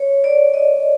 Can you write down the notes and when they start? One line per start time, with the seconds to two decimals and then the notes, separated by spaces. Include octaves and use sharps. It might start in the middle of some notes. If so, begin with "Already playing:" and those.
Already playing: C#5
0.24 D5
0.54 D#5